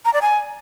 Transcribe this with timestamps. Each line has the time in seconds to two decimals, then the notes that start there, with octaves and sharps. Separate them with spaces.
0.05 A#5
0.13 D5
0.22 G#5